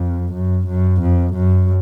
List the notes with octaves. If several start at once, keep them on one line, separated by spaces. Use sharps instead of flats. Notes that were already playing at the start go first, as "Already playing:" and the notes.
Already playing: F2
F#2
F#2
F2
F#2